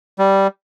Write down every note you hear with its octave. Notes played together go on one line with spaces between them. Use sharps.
G3